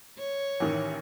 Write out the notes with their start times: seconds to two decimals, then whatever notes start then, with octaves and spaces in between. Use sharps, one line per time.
0.19 C#5
0.60 A1 D#3 E3